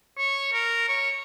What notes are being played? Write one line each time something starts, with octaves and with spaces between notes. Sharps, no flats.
C#5
A#4
C#5